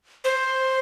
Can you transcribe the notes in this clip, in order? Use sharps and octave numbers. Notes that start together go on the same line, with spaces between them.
C5